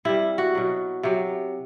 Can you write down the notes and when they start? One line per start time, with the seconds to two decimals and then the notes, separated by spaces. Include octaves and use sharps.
0.05 C3 G3 E4
0.38 F#4
0.55 B2 F#3
1.03 C3 F#3